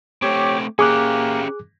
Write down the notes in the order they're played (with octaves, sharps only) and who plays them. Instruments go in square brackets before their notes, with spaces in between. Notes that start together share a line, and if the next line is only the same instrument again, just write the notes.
[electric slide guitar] A3 C4 [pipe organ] G4 C#5 D6
[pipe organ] A#3 [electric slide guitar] C#4 G4 [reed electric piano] G#4 D6 F#6